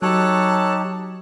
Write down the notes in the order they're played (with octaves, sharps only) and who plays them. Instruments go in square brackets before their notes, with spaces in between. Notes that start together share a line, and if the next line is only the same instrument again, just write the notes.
[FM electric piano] F#3 [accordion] D#4 G4 [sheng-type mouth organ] A4 C#5 F#6 [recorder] A5